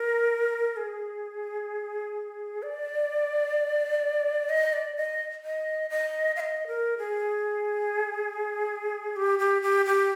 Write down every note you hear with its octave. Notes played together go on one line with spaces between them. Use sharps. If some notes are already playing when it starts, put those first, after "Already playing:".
Already playing: A#4
G#4
D5
D#5
D5
D#5
D#5
D#5
F5
D#5
A#4
G#4
G4
G4
G4
G4